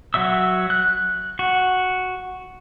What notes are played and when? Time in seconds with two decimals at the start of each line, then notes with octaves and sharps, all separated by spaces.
0.14 F#3 F#4 E5 E6
0.70 F#6
1.39 F#4